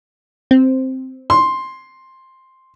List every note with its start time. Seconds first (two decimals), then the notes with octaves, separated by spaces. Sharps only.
0.51 C4
1.30 C6